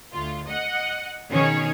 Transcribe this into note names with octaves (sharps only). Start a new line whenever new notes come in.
D2 F4
D#5 F#5
B2 D#3 C#4 G#4 C#5